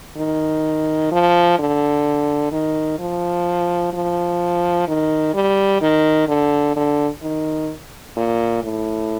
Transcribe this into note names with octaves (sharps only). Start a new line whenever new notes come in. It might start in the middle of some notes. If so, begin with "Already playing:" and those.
D#3
F3
D3
D#3
F3
F3
D#3
G3
D#3
D3
D3
D#3
A#2
A2